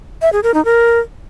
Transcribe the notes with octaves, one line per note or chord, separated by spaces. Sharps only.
E5
G#4
A#4
D#4
A#4